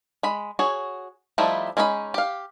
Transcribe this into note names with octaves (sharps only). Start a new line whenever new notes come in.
G#3 B5
F#4 G#4 C#5
F3 G3 A3 D#4 E4
G#3 C#4 D#4 F#4 B5
G4 F5